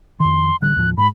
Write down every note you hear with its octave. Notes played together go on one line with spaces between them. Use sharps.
F2 D#3 C6
A1 D3 G3 F#6
D#2 A2 F3
G#2 G#3 B5